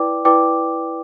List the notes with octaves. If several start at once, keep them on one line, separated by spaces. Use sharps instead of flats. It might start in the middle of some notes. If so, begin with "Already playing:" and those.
Already playing: E4 B4 D5 G5 D6
E4 B4 D5 G5 D6